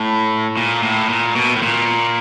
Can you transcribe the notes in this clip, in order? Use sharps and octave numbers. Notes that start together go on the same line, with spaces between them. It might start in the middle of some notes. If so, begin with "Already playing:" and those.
Already playing: A2
A#2
A2
A#2
B2
A2
A#2